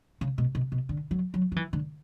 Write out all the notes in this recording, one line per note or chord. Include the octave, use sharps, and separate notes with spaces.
C#3
B2
B2
B2
D3
F#3
F#3
F#3
E3
D3